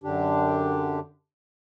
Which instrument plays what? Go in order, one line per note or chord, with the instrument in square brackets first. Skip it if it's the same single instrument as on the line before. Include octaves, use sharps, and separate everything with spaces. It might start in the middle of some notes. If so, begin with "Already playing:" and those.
[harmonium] F#2 D3 D4 G4